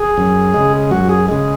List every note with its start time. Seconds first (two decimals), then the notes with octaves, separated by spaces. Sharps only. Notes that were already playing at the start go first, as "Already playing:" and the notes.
Already playing: G#4
0.17 F#2
0.54 C#3 G#3
0.91 F#2 F#4
1.09 G#4
1.28 C#3 G#3